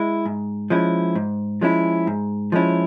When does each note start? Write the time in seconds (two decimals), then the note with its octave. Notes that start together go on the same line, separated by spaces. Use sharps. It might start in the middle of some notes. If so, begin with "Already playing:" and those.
Already playing: G#3 E4
0.26 G#2
0.70 F3 G#3 C#4 E4
1.15 G#2
1.61 F3 G#3 C#4 E4
2.07 G#2
2.52 F3 G#3 C#4 E4